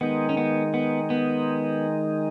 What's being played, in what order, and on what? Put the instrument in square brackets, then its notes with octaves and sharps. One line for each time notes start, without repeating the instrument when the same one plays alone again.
[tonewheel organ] D#3 G#3 D#4 [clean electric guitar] B3
[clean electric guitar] C#4
B3
B3
B3